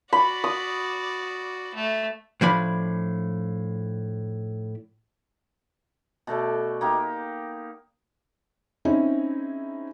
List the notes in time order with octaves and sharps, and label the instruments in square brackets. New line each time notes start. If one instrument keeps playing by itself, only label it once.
[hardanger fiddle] F#4 D5 [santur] B5
[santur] D#6
[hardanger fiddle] A3
[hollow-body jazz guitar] A2 F3 D4 B5
[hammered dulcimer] B2 A3 A4 D5
A#3 D#4 G4
[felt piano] C4 C#4 D#4 E4 G#4